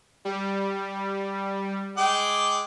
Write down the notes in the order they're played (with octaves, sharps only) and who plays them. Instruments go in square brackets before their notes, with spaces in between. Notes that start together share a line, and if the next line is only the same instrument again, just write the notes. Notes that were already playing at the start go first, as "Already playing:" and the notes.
[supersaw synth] G3
[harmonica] G#3 G5 D6